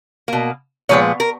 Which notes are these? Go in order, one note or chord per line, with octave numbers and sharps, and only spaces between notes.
B2 A#3
A#2 F3 G#3 B3 C#5
A#4